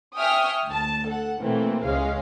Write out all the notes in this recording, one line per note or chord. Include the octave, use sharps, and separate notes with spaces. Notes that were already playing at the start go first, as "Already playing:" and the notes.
E5 G5 G#5 C#6 D#6 F6
D2 A5
A4 F#5
B2 E3 A3 A#3 C4
C#2 G#3 C#4 F5